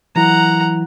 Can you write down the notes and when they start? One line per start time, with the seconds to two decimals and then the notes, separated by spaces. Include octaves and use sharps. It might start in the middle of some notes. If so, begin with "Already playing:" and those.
0.16 E3 F#3 E4 F#5 A#5